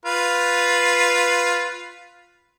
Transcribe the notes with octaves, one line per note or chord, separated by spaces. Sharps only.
F4 B4